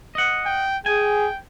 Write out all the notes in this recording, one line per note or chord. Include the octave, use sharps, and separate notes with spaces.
D#5 F#5
G5
G#4 G5 G#5